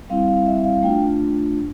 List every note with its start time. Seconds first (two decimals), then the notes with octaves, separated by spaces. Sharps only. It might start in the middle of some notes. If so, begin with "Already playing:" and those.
0.09 G3 C4 E4 F5
0.28 F5
0.46 E5
0.64 F5
0.83 A3 D4 F4 G5